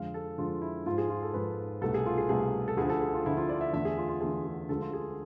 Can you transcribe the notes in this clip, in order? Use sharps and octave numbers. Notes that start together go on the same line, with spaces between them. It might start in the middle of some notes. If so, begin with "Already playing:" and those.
Already playing: F2 D3 G#3 F5
A4
F2 D3 G#3 F4
E4
G#2 F3 G#3 F4
G#4
F4
A4
G#2 F3 G#3 B4
C2 B2 A3 A4
G#4
F4
G#4
C2 B2 A3 G#4
A4
D2 D3 F3 G#4
A4
G#4
F4
D2 D3 F3 E4
F4
D5
E5
E2 D3 A3 E5
G#4
F4
F4
E2 D3 A3 G#4
G#4
D2 D3 F3 G#3 A4
F4
G#4